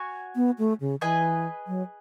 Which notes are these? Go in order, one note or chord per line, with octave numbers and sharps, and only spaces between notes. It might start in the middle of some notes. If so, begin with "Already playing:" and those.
Already playing: F#4 C#5 G#5
B3
A3
C#3
E3 G#4 B4 D#5 G#5
F#3